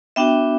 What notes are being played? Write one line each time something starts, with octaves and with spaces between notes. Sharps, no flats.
B3 D4 F#4 E5 G5